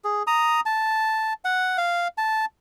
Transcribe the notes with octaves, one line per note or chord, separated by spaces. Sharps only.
G#4
A#5 D#6
A5
F#5
F5
A5